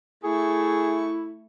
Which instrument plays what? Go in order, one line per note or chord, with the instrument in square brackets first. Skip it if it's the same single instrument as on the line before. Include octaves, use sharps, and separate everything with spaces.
[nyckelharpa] A3 C#6 [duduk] E4 [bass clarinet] G#4